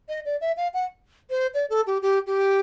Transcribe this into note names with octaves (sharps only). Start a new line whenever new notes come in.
D#5
D5
E5
F5
F#5
C5
D5
A4
G4
G4
G4